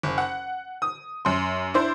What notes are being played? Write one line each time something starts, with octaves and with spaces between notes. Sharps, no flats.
F#1
F#5
D#6
F#2 C6
D4 E4 C5